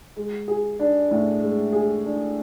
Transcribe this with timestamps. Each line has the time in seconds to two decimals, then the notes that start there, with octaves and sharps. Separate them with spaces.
0.17 G#3
0.48 G#4
0.79 D4
1.11 A2
1.42 G#3
1.72 G#4
2.05 D4